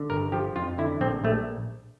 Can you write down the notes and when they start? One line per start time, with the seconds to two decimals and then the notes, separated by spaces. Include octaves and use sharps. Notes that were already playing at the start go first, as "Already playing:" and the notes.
Already playing: D3
0.10 G1 A#4
0.32 F3 G4
0.56 F2 F4
0.78 D3 E4
1.01 A#1 C4
1.24 A#1 A3